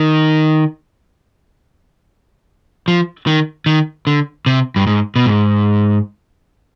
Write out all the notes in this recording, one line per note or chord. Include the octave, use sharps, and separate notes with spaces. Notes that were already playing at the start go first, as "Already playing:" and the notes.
Already playing: D#3
F3
D#3
D#3
D3
C3
G2
G#2
B2
G#2